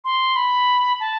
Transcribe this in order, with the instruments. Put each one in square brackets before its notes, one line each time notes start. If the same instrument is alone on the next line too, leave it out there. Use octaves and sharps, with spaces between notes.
[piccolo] C6
B5
A5